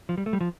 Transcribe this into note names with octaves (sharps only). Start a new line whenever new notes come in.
F3
G3
A3
G3
F3